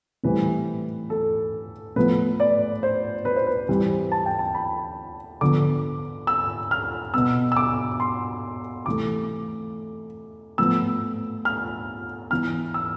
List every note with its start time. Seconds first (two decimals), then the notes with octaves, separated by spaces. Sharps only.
0.23 A2 E3 G3 C4 B4
1.10 A4
1.96 A2 F3 B3 B4
2.40 D5
2.83 C5
3.25 B4
3.36 C5
3.47 B4
3.69 E3 G3 C4
4.12 A5
4.26 G5
4.39 A5
4.55 B5
5.41 D3 F3 B3 D6
6.27 E6
6.71 F6
7.14 B2 B3 E6
7.52 E6
7.57 D6
8.00 C6
8.86 C3 E3 A3 D6
10.58 A2 F3 B3 E6
11.45 F6
12.31 E3 B3 F6
12.74 E6